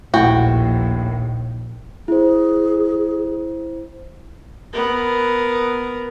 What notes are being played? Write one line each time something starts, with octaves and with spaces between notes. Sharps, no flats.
A#1 D#2 A2 F#4 G5
E4 G#4 C5
B3 A#4